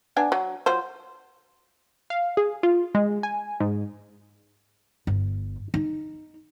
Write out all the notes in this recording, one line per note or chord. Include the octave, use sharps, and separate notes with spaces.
B3 D4 G#5
F#3
F#3 F4 C5
F5
G#4
F4
G#3
G#5
G#2
G1
D#4